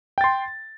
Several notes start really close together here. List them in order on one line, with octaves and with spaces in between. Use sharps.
G5 A6 C6